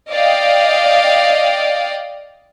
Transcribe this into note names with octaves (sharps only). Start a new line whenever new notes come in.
D5 D#5 F5 G5